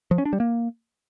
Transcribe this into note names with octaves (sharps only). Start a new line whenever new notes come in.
F3
C#4
D4
G3
A#3